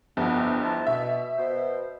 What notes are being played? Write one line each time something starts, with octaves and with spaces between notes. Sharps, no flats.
G1 F2 E3 A3 B3
E4 C5 A5
B2 E5
B2 C5